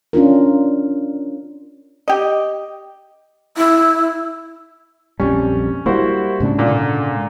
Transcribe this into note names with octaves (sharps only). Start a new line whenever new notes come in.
C#4 D4 F4 A#4
G4 D#5
E4
A#1 F2 G3 C#4
G3 A#3 E4 F#4 C5
G#2 C#3 D4
A#2 D3